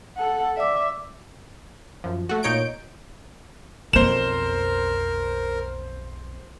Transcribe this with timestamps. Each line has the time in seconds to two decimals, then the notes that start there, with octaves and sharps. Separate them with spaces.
0.17 A4 F#5
0.57 D5 E5 D6
2.04 F#2 F3
2.29 A3 F#4
2.43 A#2 D#4 C#5 G6 D7
3.93 B1 F2 A#4 C5 E7